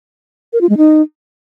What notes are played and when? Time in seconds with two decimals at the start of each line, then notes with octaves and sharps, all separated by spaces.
0.53 A#4
0.61 F4
0.69 G#3
0.77 D#4